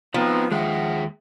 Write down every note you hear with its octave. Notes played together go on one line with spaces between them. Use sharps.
F3 B3 C4 D#4
D#2 G#3 G#4 E5 F#5 G5